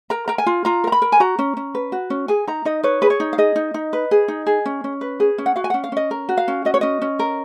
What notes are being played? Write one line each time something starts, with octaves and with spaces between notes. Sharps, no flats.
A#4 A#5
A#4 A#5
G#5
F4
F4 A#5
A#4 A#5
B5
A#4
G#5
F#4 A#5
C#4
C#4
B4
F#4
C#4
G#4 G#5
D#4 A#5
D#4 D#5
B4 C#5
G#4 B4
C#5
D#4
F5
G#4 D#5
D#4
D#4
B4
G#4
D#4
G#4
C#4
C#4
B4
G#4
C#4
F#5
F#4 F5
G#5
C#4 F#5
F5
C#4 D#5
A#4
F#4
F5
C#4
F#4 D#5
C#5
C#4 D#5
C#4
A#4